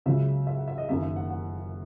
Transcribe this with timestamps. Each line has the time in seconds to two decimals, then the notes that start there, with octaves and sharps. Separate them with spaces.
0.06 C#2 C#3 F#3 E5
0.47 E5
0.57 F#5
0.68 E5
0.78 D#5
0.89 F#1 F#2 D#3 A#3 E5
1.03 E5
1.16 F#5
1.30 F#5